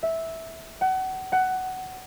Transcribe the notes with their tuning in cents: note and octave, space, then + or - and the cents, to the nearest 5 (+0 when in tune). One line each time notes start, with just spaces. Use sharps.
E5 -10
F#5 +30
F#5 +15